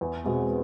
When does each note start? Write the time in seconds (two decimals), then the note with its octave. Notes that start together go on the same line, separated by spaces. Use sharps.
0.01 E2
0.24 B2 G#3 C4